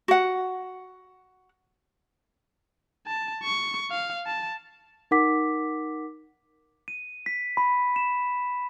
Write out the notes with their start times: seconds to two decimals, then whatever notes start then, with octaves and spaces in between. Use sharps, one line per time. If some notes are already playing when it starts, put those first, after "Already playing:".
0.08 F#4 F#5
3.07 A5
3.44 C#6
3.90 F5
4.26 A5
5.11 D#4 A#4 F#5 D6 B6
6.88 D#7
7.26 B6
7.57 B5
7.96 E7